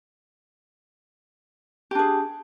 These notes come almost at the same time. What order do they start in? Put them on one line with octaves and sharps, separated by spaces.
G4 D4 G#4